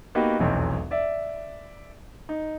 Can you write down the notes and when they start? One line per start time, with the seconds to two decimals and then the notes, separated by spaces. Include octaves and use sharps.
0.15 A#3 B3 D#4 F#4 G4 B4
0.39 F1 B1 E2
0.91 D5 E5
2.29 D#4